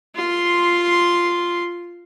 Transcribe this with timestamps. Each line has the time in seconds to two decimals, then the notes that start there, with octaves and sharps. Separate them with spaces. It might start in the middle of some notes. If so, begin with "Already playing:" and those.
0.15 F4 C6